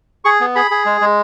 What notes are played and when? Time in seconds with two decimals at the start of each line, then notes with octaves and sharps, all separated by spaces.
0.25 G#4 C#6
0.40 B3
0.56 G#4 B5
0.71 G#4
0.85 G#3
1.01 G#3